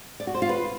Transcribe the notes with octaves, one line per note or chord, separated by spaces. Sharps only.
D5
F#4
C5
F4
B4